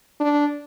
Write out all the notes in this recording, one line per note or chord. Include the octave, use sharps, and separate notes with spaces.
D4